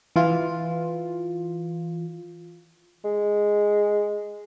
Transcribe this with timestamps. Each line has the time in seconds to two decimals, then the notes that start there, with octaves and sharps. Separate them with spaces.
0.16 E3 F4
3.05 G#3